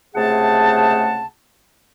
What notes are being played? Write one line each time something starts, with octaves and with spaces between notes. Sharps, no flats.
C#2 C3 A3 G#4 F#5 A5